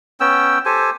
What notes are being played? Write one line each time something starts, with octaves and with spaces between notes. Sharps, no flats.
B3 C#4 G5 E6
G4 A4 C5 G#5